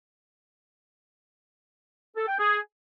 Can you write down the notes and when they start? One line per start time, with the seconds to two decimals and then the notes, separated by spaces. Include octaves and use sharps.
2.16 A4
2.28 G5
2.39 G#4